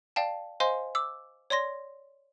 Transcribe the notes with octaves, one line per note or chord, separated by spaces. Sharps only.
D5 F5 G5 A5
C5 D#5 F5 G#5 C6
D6 E6
C#5 D5 C6 A#6